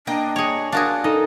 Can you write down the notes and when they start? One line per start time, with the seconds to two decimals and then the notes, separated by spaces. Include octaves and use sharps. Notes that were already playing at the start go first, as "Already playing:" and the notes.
0.07 A#3 D4 D#5 G5
0.36 G#4 C#5
0.72 D4 F4 F#4 G#4 A#4
1.04 D#4 A4 D#5